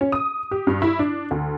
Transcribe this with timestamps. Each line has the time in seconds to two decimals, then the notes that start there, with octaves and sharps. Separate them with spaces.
0.01 C#4
0.12 D#6
0.51 G4
0.67 G2
0.82 E4
0.99 D4
1.31 D2